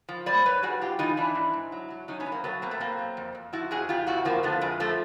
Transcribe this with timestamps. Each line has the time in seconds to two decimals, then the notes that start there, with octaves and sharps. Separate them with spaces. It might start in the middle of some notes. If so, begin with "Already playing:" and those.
0.09 F3
0.26 G3 C5 D5
0.45 G#2 B4 C#5
0.63 G3 F#4 G#4
0.81 G#2 F4 G4
0.99 E3 D#4 F4
1.17 E3 D4 E4
1.35 G#2
1.53 G#2
1.72 F#3
1.90 F#3
2.08 F#3 C#4 D#4
2.20 B3 C#4
2.26 F#3
2.32 A#3 C4
2.44 F#3 A3 B3
2.62 B2 A#3 C4
2.71 A3 B3
2.80 B2 A#3 C4
2.99 F#3
3.17 F2
3.35 F2
3.53 F3 E4 F#4
3.71 F2 F#4 G#4
3.89 F2 F4 G4
4.07 F2 E4 F#4
4.25 F3 A#3 C4
4.43 D3 A3 B3
4.61 F2 G#3
4.80 F3 A3